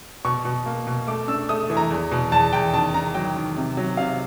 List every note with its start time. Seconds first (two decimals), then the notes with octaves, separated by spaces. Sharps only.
0.25 B2 C#6
0.45 B2
0.66 A#3
0.87 B2
1.07 A3 D6
1.28 D4 E6
1.49 A3 D#6
1.70 E3
1.77 A#5
1.90 E2
2.11 B2
2.32 E2 A5
2.53 E2 G5
2.74 D#3 A5
2.94 D#3 A#5
3.14 F#3 G5
3.35 D#3
3.57 C3
3.77 F#3
3.97 C3 F5